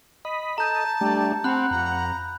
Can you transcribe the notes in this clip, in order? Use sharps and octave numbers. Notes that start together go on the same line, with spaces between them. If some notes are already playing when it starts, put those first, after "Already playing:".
D#5 B5
A4 D#5 A5 A#5 G6
G3 A3 D4 G4
C4 F#5 B5 F#6
F2 A#5